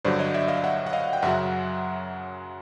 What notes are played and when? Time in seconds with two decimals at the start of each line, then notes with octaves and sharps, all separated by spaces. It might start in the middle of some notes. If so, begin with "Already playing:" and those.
0.05 G2 D3 F#3 C5 D5
0.19 C#5 D#5
0.34 D5 E5
0.48 D#5 F5
0.64 E5 F#5
0.86 F#5
0.93 D#5 F5
1.13 G5
1.22 F#2 C#3 F#3 E5 F#5